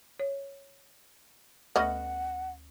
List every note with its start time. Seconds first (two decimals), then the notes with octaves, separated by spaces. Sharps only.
0.20 C#5
1.76 D2 A3 B3 D#5 F#5 F6 A#6